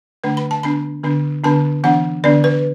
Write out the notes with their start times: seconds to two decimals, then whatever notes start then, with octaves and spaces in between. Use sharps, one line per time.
0.24 D3 A3 D4 B4
0.37 B5
0.51 A5
0.63 D3 B3 D4 B5
1.04 D3 B3 D4
1.44 D3 B3 D4 A5
1.84 E3 B3 D4 F#5
2.24 D3 B3 D4 D5
2.44 B4